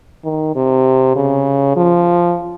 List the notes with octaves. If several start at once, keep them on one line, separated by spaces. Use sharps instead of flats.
D#3
C3
C#3
F3